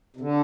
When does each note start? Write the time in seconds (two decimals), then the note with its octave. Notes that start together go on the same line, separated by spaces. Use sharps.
0.16 C3
0.20 D3